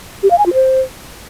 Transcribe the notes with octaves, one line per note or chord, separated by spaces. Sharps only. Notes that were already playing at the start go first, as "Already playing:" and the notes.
G4
F5
G#5
F4
C5